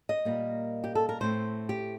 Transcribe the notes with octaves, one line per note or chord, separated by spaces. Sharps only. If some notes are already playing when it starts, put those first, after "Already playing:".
D#5
A#2 G3 A#3
G4
A4
A#4
A2 A3 C4 C5
G4